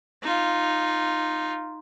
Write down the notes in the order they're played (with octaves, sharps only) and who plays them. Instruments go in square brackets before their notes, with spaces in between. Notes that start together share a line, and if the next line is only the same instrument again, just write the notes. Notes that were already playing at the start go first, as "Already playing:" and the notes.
[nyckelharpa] D#4 F4